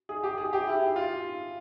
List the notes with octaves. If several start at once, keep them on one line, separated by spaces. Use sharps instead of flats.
G#4
G4
G#4
G4
E4
F4